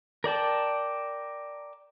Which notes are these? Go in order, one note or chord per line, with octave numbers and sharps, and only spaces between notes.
A#4 D5 G5 A5